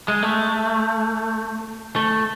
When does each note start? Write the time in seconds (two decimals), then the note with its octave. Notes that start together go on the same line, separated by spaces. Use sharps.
0.08 G#3
0.23 A3
1.96 A3